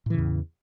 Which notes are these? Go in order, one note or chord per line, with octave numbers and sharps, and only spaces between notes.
E2 A2 C#3 E3